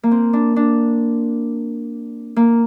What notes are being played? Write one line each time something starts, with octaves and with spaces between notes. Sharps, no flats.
A#3
C4
D4
D4
A#3